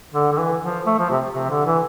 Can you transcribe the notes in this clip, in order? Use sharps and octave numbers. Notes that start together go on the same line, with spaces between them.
D3
D3
E3
F3
A3
F3
C3
C3
D3
E3